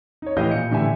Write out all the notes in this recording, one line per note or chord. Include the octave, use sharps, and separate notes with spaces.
D#4 C#5
A2 E3 G4 D#5 F5 G6
A#2 C#7
A2 D3 E3 G4 E5 G#5